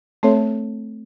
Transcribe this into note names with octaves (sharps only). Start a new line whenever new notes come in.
A3 C4 A4 C#5 E5